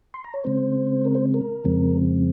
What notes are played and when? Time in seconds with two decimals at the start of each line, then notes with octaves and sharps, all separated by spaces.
0.14 C6
0.24 A#5
0.34 C#5
0.44 C#3 G#3 C4 C5
1.05 A#4
1.15 C5
1.34 A#4
1.64 F2 C#3 F3 G#3 C4